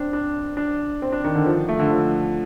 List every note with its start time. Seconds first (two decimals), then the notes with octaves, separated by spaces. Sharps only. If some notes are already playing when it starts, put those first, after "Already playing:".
Already playing: C4 D4
0.13 D4
0.57 D4
1.02 C4
1.13 D4
1.24 D#3
1.35 D3
1.46 F3
1.69 A3
1.79 D3
1.90 F3